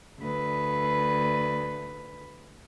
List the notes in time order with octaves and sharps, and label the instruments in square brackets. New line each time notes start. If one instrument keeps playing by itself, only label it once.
[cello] D2 B4